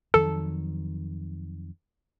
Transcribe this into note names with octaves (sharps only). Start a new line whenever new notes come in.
F2 D#3 F#3 A4